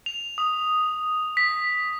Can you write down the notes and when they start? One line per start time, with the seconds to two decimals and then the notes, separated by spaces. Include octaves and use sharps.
0.06 F7
0.38 D#6
1.37 B6